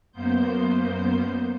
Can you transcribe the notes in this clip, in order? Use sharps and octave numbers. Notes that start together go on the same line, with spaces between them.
F#2 A#3 B3 C5 G6